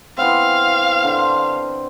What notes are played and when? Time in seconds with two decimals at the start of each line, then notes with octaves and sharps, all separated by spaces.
0.17 E3 B3 C4 F5
1.04 D3 C5